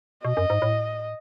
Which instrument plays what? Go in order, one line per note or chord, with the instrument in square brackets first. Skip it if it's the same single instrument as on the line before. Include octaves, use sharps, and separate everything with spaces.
[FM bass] B2 [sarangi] D#5
[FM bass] F#2
G#2
A2